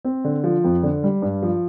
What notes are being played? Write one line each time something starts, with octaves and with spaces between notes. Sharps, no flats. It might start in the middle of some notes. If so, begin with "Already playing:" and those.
C4
D3
F3
F2
D3
G3
G2
F3